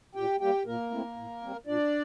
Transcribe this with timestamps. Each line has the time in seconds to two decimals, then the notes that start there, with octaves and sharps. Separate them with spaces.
0.15 A#2 G4 G5
0.40 G3 A#3 G4 G5
0.66 A#2 A#3 A#4
0.91 A3 C4 E4
1.16 A2
1.42 G3 C4
1.66 A#2 D4 D5